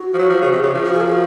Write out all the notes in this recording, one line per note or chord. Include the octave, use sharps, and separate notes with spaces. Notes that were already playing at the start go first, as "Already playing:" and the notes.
Already playing: F#4
F3
F#3
F3
C#3
C3
C#3
F3
F#4
G#4
A#4
F#4